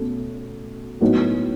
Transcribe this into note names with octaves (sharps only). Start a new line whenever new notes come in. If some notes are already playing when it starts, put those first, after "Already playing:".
Already playing: B2 A3 C#4
A2 F#3 B3 D#4 F#4